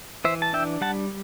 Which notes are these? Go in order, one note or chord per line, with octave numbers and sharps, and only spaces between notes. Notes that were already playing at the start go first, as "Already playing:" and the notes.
E3 C5 E5
A5
D4 E5 G5
G3 F#5 A5